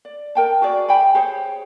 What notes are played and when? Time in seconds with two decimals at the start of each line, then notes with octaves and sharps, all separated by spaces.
0.05 D5
0.35 A#4 G5 A5
0.62 F#4 G#4 D5
0.89 E5 G5 G#5 B5
1.15 G4 G#4 C5 C#5